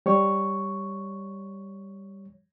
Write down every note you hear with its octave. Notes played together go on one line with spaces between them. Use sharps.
G3 C#5 C#6